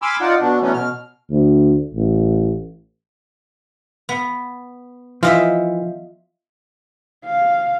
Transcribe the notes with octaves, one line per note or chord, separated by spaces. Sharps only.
G#5 B5 C6 D6 E6 F6
D#4 F4 D5 F#5
B2 F#3 D4
E3 F#3 A3 B3 C#4
B2 F6
D2
A1
B3
E3 F3 F4 D#5 E5
F5